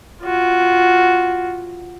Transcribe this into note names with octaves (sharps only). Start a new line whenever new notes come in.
F4 F#4